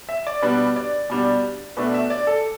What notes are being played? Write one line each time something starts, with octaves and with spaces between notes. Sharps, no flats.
E5
D5
B2 G3 D4 B4
D5
B2 G3 D4
B2 A3 D4 B4
E5
D5
A4